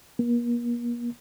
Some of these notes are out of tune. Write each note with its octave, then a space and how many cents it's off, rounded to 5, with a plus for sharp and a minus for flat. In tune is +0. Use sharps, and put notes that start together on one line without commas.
A#3 +40